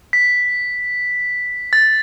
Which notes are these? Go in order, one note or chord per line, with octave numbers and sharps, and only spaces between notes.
B6
A6